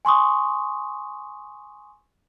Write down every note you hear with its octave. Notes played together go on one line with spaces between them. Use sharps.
G#5 C6 C#6 D#6